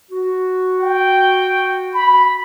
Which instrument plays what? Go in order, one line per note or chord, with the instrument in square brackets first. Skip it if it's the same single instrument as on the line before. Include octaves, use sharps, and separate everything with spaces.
[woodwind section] F#4
[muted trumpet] G5
B5